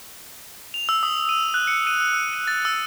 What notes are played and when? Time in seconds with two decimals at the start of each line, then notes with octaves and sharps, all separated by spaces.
0.74 F7
0.89 E6
1.03 D#6
1.29 D#7
1.54 F#6
1.67 C#7
1.87 D#7
2.00 E6
2.13 E6
2.34 D#7
2.47 A6
2.65 E6